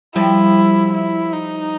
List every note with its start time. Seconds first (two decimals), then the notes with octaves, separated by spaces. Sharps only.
0.15 F3 G3 E4
0.93 E4
1.33 D#4